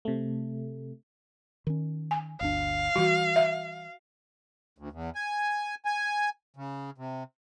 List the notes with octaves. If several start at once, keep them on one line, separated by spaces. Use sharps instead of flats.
C3 A3
D#3 C#4
G#5
G1 D2 D4 F5
E3 G3 F#4
E5
D2
E2
G#5
G#5
C#3
C3